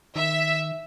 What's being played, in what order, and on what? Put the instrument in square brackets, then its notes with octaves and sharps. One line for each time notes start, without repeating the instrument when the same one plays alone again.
[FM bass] D#3 [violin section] E5